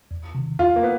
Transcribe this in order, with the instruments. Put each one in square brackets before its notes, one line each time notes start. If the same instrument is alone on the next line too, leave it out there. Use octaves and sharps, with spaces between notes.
[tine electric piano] E2
C3 D#3
[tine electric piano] E2 [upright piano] F4
[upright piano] A#3
B3